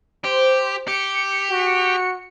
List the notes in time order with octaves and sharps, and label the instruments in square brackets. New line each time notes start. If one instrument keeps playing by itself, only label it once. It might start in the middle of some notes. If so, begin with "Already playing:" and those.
[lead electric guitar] G4 [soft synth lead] C5
[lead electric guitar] G4 [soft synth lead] C#7
[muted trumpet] F#4